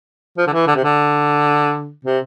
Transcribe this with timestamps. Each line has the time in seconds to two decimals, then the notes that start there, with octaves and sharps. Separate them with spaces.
0.38 F3
0.47 D3
0.53 E3
0.67 D3
0.76 C3
0.84 D3
2.05 C3